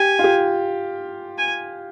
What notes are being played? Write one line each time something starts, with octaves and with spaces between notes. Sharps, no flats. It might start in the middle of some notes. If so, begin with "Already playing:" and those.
Already playing: G4 G#5
F4
G4
G#5